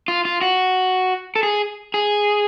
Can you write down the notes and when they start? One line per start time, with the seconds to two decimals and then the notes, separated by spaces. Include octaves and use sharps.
0.08 F4
0.25 F4
0.41 F#4
1.36 A4
1.43 G#4
1.94 G#4